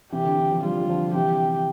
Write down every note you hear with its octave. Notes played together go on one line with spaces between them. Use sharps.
C3 E3 G4
D3
D3
D3 F3
E3 G3 F4
G3
D3 F3
C3 E3 G4
C3